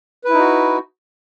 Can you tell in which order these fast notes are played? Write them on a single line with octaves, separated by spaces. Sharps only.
B4 E4 D#4 F#4